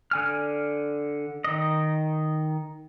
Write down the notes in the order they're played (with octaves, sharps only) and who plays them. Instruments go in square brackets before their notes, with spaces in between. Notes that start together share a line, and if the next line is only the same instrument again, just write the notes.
[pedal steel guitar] D3 G#5 F6
D#3 D#5